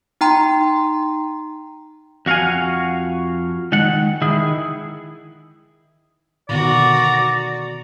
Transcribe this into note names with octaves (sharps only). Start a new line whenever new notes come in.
D#4 G5 A#5 C6
F2 F#4 F5 F#5 G#5
D#3 G#3 F#5
D#3 E4 G#4
B2 D3 D#3 F#4 D5 A#5